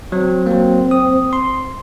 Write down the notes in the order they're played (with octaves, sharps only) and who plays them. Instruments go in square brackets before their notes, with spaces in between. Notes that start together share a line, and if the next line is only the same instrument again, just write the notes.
[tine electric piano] F#3 [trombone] C4
[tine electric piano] F#3 A#3
D#6
C6